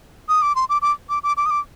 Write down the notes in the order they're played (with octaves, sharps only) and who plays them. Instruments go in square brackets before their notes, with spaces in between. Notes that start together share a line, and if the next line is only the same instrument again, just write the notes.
[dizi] D#6
D6
C6
D6
D6
D6
D6
D6
D#6
D6